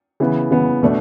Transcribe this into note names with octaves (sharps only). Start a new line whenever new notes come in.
C#3 E3 B3
C#3 E3 B3
B2 A3 D4